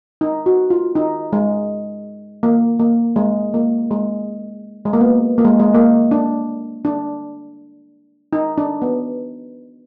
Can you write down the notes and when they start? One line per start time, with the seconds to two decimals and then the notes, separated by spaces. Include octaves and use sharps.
0.21 D#4
0.46 F#4
0.70 F4
0.95 D#4
1.33 G#3
2.43 A#3
2.80 A#3
3.16 G#3
3.54 A#3
3.91 G#3
4.85 G#3
4.93 A#3
5.00 B3
5.38 A#3
5.45 G#3
5.59 G#3
5.74 A#3
6.11 D4
6.85 D4
8.33 D#4
8.58 D4
8.82 B3